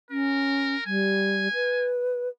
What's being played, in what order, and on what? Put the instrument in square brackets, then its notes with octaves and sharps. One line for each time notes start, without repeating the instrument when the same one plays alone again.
[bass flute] C#4 [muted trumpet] A#4
[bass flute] G3 [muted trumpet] G#5
[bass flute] B4